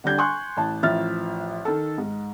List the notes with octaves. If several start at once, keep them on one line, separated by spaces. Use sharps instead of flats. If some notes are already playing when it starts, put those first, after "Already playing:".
D3 G3 D4 G6 G#6
G#5 C6 C#6 F#6
A1 A5
A1 F3 E5 F6 A6
D#3 A4
G#2